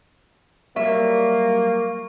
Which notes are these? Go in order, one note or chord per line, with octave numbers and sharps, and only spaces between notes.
F#3 G3 A#3 E5 C#6